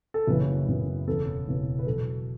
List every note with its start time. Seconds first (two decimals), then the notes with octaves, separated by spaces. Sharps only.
0.14 A4
0.27 F#1 F#2 C#3 E3 B3 B4
0.67 F#1 F#2 C#3 E3 B3
1.07 E1 E2 C#3 E3 B3 A4
1.47 E1 E2 C#3 E3 B3
1.79 B4
1.86 E2 B2 F#3 A4